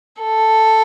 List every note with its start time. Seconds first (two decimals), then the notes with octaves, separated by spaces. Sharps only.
0.21 A4